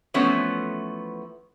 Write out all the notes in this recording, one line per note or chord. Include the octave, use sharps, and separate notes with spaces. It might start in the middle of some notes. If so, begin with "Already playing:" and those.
E3 F3 A3 B3 C#4